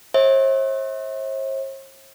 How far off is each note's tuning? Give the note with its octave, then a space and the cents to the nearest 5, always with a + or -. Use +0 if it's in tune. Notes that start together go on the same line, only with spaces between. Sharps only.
C5 +45 E5 -35